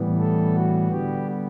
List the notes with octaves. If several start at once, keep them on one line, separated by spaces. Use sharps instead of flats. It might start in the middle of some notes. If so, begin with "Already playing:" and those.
Already playing: A2 E3 G3 B3
A4
F#4
D3 G3 B3 G4